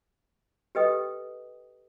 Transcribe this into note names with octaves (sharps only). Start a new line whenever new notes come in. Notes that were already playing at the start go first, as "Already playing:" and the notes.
G4 A4 B4 D#5 G5 D#6